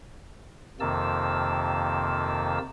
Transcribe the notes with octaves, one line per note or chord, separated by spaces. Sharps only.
F2 C3 D#3 A#3 A5 E6